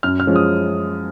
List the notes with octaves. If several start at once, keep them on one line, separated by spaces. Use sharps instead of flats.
F#2 F6
F6
F3 G#3 C#4
D#6